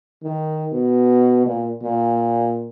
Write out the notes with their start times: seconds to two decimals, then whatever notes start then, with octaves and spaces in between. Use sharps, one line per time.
0.23 D#3
0.72 B2
1.46 A#2
1.82 A#2